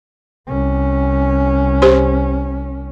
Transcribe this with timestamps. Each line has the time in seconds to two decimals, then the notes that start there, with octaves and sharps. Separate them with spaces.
0.47 C2 C#4
1.82 G4 C5 C6